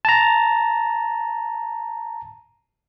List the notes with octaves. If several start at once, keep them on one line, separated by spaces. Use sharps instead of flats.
A5 A#5